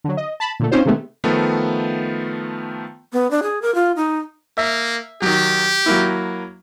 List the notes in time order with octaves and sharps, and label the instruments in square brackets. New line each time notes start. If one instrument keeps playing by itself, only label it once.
[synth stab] D3 F#3
D#5
A5 B5
A#2 D3 A3
C4 C#4 D#4 F4 C5
C3 D#3 G#3 A3 B3
[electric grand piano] D#3 F3 A3 B3
[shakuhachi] B3
D4
G#4
A#4
F4
D#4
[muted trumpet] A#3 [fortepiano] E5
[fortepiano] D#3 F#3 [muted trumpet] G4
[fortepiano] F#3 A#3 E4